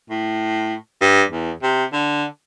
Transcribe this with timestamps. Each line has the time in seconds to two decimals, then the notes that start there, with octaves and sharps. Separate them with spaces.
0.10 A2
1.01 G2
1.31 E2
1.62 C3
1.93 D3